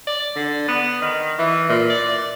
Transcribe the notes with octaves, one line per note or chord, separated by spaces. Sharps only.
D5
D3
B3
D#3
E3
A#2
D5